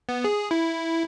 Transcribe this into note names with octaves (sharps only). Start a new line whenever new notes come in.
B3
G#4
E4